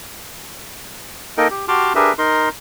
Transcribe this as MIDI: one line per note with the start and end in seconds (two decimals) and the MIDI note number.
1.38 1.48 58
1.38 1.48 63
1.38 1.48 69
1.38 1.48 70
1.38 1.48 75
1.38 1.48 79
1.51 1.66 67
1.68 1.93 66
1.68 1.93 67
1.68 1.93 81
1.68 1.93 84
1.68 1.93 86
1.68 1.93 89
1.95 2.13 62
1.95 2.13 67
1.95 2.13 68
1.95 2.13 70
1.95 2.13 71
1.95 2.13 76
2.18 2.49 63
2.18 2.49 70
2.18 2.49 84